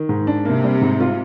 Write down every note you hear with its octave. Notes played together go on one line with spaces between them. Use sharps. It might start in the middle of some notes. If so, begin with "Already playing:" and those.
Already playing: D#3
G#2
D4
C3 A#3
G3
G#2
F4